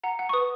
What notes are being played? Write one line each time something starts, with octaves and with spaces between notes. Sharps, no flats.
F#5 A#5
F#5
C#6
B4 D#6